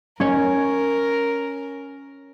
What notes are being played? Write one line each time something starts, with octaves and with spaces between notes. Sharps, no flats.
C#4 A#4 C#5